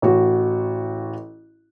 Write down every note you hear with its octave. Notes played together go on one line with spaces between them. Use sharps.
A1 F#4